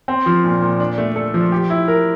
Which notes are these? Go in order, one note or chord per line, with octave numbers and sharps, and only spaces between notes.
C4
F3
A#2
A#2
D4
A3
A4
F3
G4
E4
A#4